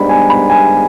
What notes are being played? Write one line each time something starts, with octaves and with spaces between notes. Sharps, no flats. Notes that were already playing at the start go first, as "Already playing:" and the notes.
Already playing: G#2 G3 B3 D4 G4 B5
G#5
B5
G#5